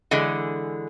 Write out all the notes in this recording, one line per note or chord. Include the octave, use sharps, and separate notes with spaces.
D3 E3 G#3